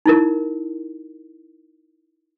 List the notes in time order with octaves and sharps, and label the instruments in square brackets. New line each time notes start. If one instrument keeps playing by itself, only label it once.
[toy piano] D#4 E4 A#4